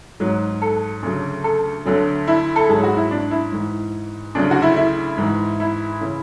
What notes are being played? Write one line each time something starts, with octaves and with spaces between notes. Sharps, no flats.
G#2 F#3
A4
D2 C#3 F#3
A4
D2 D3 F#3
E4
A4
G#2 F#3 G#4
F#4
E4
D4
E4
G#2 E3
D2 C#3 F#3 D4
F#4
E4
E4
G#2 E3
E4
C#3 E3